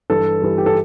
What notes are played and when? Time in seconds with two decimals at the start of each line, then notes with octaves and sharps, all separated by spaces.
0.10 G2 E3 G3 A4
0.42 G2 E3 G3
0.58 G4
0.66 A4